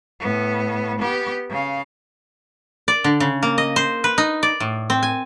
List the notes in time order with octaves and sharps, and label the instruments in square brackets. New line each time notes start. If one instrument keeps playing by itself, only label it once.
[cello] A2 B3
B3 G4
C#3 F5
[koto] D5
D3
C#3
A#3
D#5
C5
B4
D#4
D5
A2
C4
G#5